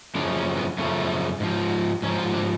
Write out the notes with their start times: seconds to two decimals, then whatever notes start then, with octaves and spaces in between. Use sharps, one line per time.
0.15 F#2 C#3 F3 D4
0.37 C#4
0.57 B3
0.78 F#2 C#3 F3 A3
1.40 G#2 F3
2.02 G#2 C#4
2.08 F3
2.19 F4
2.34 D4